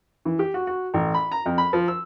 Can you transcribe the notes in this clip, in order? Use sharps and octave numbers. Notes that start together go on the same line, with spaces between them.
E3
G4
F#4
F#4
A1
B5
A#5
F2
B5
F3
E6